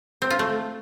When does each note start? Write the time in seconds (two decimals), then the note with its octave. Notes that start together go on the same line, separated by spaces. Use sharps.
0.22 C4
0.30 F4
0.39 A3